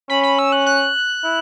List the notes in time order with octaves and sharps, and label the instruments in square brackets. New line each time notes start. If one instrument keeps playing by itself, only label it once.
[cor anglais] C#4 [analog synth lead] B5
[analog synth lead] B5
E6
F#6
F#6
[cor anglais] E4